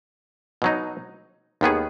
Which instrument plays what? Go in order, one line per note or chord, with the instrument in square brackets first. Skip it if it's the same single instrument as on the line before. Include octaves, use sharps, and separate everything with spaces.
[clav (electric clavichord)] B2 F#3 D#4
D#2 D#3 B3 G#4